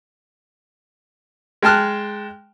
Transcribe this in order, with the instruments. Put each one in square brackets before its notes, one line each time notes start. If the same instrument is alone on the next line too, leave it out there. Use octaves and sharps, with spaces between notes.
[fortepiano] G#3 G5 A5 F6 F#6